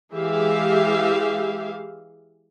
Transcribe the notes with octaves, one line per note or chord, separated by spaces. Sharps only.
E3 G#3 G4 G#4 E5 F5